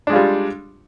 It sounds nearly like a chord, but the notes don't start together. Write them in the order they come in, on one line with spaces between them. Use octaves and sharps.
D4 G#3 F4 G3